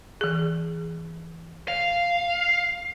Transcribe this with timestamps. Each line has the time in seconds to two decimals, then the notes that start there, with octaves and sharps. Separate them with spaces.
0.21 E3 G#4
1.68 F5